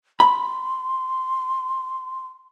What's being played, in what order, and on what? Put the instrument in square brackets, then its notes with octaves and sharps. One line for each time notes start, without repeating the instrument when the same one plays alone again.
[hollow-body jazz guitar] B5 [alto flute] C6